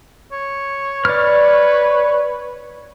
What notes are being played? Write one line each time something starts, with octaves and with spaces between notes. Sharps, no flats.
C#5
B4 D5 F6